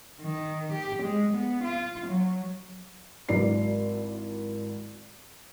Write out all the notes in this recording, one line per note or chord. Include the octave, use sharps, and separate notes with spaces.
D#3
G4
G#3
B3
F4
F#3
G#1 F#3 E4 D5 C7